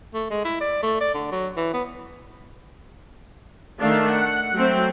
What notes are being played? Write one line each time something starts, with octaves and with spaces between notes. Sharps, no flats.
A3
G#3
E4
D5
A3
D5
D3
F#3
E3
B3
D#3 A3 D4 F5
F#5
F#3 A3 C4